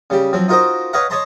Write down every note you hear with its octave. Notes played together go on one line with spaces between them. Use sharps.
C#3 G3 G4
F3 F#3 C4
D#4 F4 F#4 A#4 C5 D#5
B4 C#5 D#5 F5 F#5 A#5
C#5 D#5 A5 A#5 C6